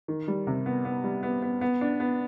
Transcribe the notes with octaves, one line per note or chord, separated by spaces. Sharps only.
D#3
G3
C3
B3
B3
G3
B3
B3
B3
D4
B3